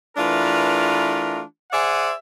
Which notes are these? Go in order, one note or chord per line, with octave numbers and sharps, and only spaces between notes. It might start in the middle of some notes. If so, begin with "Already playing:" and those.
E3 A3 D4 F4 A#4 B4
G#4 C5 D5 E5 F#5 G#5